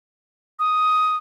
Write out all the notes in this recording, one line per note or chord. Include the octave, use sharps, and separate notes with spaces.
D#6